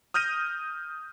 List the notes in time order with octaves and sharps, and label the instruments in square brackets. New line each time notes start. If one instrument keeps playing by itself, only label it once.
[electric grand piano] D#6 F6 G6 A#6 D#7